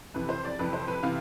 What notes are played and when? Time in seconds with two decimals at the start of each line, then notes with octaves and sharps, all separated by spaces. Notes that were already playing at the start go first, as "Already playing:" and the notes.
0.14 F2 C3 E3 B4
0.29 C5
0.45 D5
0.59 F2 C3 E3 B4
0.73 C5
0.88 B4
1.03 C3 E3 F5